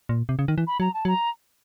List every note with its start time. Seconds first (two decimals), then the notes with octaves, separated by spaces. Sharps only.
0.09 A#2
0.29 C3
0.39 C#3
0.48 D#3
0.58 E3
0.67 B5
0.80 F#3 A#5
0.94 A5
1.05 F#3 A#5